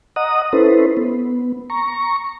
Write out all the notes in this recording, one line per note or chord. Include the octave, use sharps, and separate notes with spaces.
D#5 F#5 A#5 D#6
C#4 E4 A4 B4 C5
B3
A#5 C#6